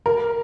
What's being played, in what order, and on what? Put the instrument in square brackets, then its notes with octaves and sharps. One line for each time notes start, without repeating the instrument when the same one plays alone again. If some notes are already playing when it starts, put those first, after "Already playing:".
[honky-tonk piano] A#4